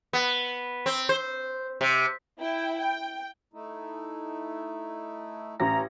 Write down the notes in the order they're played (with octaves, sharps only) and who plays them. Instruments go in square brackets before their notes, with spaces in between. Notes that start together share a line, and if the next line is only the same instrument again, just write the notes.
[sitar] B3
C4
C5
C3
[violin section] E4 G5
G5
[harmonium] A3 D#4 E4
[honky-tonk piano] A1 C#4 A#6 [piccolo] A#5